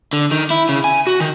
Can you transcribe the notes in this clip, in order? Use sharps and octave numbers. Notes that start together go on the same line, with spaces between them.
D3
D#3
E4
C#3
G#5
F#4
D#3